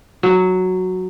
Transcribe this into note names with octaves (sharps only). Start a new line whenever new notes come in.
F#3